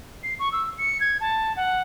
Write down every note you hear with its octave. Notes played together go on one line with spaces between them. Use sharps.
C7
C#6
E6
C#7
G#6
A5
F#5